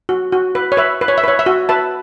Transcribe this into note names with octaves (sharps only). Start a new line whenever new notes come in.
F#4
F#4
B4
C#5
B4 E5
B4
C#5
E5
B4 C#5
E5
F#4
B4 E5 A5